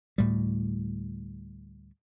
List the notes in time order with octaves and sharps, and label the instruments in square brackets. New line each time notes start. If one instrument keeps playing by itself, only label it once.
[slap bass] D2 A2 G3